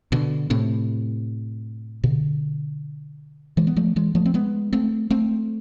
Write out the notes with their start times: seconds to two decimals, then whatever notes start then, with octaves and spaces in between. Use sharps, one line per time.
0.12 B2 D3
0.50 A2 C3
2.04 B2 D3
3.57 E3 G#3
3.67 B3
3.77 F3 A3
3.96 E3 G#3
4.15 F3 A3
4.26 C4
4.34 G#3 B3
4.73 A3 C4
5.10 A3 C4